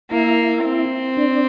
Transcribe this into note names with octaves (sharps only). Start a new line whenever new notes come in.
A#3 E4
C4
D4